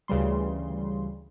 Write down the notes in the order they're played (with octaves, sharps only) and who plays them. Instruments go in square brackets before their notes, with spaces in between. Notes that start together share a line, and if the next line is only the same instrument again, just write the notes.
[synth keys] D2 C#3 E3 G3 C6